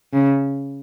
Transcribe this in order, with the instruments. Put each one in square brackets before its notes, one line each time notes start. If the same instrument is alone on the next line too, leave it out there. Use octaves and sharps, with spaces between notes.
[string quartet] C#3